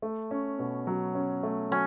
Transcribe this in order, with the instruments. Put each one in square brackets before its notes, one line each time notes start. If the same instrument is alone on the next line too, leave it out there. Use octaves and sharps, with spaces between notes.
[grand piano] A3
C#4
B2
F#3
C#4
A3
[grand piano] F#3 [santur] C#4